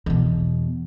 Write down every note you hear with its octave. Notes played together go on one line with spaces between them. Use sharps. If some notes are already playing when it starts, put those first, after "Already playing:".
E2 B2